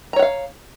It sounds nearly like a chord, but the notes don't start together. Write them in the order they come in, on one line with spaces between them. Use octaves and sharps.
A#5 C#5 F#5 F5